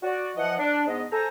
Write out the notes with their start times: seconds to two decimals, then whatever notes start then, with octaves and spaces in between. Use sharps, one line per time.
0.03 F#4 D5
0.36 E3 F3 D#5 F#5
0.58 D4
0.87 G#2 B3 D#5
1.12 A4 C5 G#5 A#5